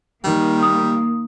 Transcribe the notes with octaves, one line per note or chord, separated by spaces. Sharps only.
D#3 G3 A#3
D#6